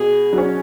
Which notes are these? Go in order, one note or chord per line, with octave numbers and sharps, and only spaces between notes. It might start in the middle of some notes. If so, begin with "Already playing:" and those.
Already playing: B2 G#4
F#3 C#4